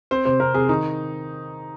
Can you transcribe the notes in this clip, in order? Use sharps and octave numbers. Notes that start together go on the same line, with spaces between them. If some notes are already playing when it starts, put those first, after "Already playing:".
C4 C5
C3 C5
C3 A#4
C3 G#4
D#3 D#4